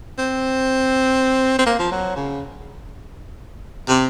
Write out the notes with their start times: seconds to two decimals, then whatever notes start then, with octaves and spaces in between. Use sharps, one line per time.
0.18 C4
1.58 C4
1.66 A#3
1.79 F3
1.91 F#3
2.16 C#3
3.88 C3